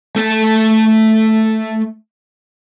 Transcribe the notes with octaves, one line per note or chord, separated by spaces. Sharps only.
A3 A5